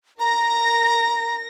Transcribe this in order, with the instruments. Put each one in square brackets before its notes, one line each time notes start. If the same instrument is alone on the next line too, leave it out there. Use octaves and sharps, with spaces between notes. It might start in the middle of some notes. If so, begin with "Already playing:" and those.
[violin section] A#4 A#6 [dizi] A#5